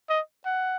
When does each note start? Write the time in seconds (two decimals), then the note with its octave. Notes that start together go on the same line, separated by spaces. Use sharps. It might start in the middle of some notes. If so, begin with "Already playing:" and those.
0.10 D#5
0.46 F#5